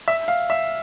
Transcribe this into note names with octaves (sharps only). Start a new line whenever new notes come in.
E5
F5
E5